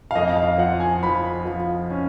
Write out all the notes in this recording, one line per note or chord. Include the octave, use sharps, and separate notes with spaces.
F5
F2 D#5
F5
F3 F#5
G#5
F3 B5
F3
C#4